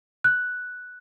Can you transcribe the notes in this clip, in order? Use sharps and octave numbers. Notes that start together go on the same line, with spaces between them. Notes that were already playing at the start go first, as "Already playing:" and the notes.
F#6